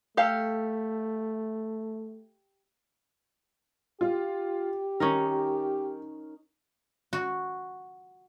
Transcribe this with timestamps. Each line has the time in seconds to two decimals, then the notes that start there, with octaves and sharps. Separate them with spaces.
0.17 A3 G4 A4 F5
4.01 F4 G4
5.00 D#3 C#4 D#4 A#4
7.13 F#4